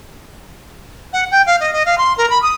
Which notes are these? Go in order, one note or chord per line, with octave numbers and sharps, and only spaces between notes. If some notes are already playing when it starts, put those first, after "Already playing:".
F#5
G5
F5
D#5
D#5
F5
C6
A#4
B5
D#6